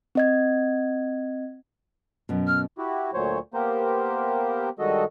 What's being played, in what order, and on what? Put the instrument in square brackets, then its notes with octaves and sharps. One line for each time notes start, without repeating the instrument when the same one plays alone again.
[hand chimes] C4 D#5 G#6
[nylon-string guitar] F#2 B2
[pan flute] F6
[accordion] E4 F#4 G4
D2 A#2 F#3 C5 C#5
A#3 B3 G4 A#4 C5
G2 D#3 G#3 F#4 A4 D#5